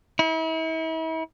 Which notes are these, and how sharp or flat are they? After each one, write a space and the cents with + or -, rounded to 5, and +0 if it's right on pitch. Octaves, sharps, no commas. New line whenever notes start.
E4 -40